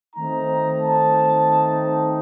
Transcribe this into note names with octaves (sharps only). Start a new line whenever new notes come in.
D#3 A3 C4 D#4 A#5
A5